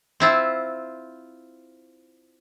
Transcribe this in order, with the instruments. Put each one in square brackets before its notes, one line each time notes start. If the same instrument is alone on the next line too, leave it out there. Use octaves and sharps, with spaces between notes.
[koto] C4 E4 F4